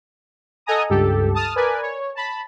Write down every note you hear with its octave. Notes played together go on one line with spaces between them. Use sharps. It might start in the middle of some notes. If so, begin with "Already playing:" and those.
A4 D#5 F#5 G#5 A#5 D#6
C#2 G2 G4 A4
A5 D#6 F6
A#4 B4 D5 G#5
C#5
A5 B5